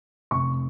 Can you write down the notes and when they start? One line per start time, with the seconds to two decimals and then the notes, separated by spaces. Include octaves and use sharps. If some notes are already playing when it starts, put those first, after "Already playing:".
0.31 F1 C#6